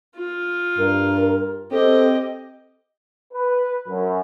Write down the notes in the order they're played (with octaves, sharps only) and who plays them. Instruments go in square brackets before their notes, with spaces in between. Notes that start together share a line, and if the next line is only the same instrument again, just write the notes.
[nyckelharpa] F4
[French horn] G2 [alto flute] A#4
[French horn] C4 [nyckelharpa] G4 D#5 [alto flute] A4
[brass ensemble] B4
F#2